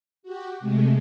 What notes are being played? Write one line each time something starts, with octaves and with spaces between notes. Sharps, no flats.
F#4 G4
C3 G#3 A3